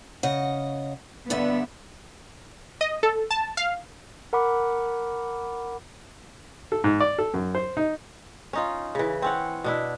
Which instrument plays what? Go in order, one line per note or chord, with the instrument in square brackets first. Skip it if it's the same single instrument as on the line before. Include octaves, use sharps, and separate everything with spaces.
[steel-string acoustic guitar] C#3 D#5 F#5
[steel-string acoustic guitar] G2 D3 E5 [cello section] B3
[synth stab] D#5
A4
A5
F5
[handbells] A#4 F#5 B5 D6
[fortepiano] A4
G#2
D5
A4
F#2
C5
D#4
[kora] C#4 D#4 F4
C#3 E3
C4 C#4 F#5
B2 D4 E4